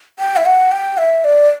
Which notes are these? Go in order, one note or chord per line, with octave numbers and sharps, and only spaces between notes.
G5
E5
F#5
G5
E5
D5